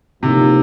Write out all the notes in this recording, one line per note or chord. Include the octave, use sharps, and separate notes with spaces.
A2 C3 F3 A#3 D#4